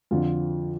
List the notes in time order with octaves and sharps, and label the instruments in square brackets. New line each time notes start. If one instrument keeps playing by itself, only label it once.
[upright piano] F2 D3 F3 F4